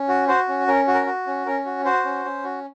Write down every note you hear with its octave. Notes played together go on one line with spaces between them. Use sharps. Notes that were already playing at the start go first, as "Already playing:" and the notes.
Already playing: C#4
F#4
F#4 C5
C#4
C#4 A#4
F#4
A#4
F#4
C#4
C#4 A#4
F#4
F#4 C5
C#4
C#4
F#4